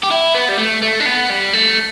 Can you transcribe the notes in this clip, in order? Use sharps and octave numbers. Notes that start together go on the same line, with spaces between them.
G4
E4
B3
G3
A3
A3
D4
B3
G3
A3